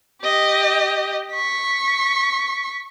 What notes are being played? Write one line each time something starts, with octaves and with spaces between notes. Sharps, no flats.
G4 D#5
C#6 B6